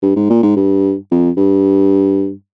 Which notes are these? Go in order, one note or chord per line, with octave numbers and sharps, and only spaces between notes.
G2
G#2
A#2
G#2
G2
F2
G2